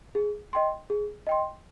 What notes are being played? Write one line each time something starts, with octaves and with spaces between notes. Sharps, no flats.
G#4
D#5 G5 C6
G#4
D#5 G5 C6